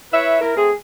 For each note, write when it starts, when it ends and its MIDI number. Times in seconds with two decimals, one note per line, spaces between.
0.13 0.38 64
0.13 0.38 71
0.13 0.38 73
0.13 0.38 76
0.41 0.55 64
0.41 0.55 70
0.57 0.72 57
0.57 0.72 60
0.57 0.72 68